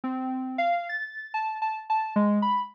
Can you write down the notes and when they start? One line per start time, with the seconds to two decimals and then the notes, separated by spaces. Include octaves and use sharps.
0.04 C4
0.58 F5
0.89 A6
1.34 A5
1.62 A5
1.90 A5
2.16 G#3
2.42 B5